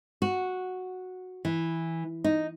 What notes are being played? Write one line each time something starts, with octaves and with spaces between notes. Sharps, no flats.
F#4
E3
D#4